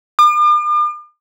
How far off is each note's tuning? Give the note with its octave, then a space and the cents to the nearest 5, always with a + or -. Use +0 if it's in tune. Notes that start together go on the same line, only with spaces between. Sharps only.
D6 +45